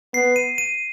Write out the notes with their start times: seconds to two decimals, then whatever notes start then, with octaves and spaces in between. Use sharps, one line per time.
0.14 B3 C7
0.36 D#7
0.58 D#7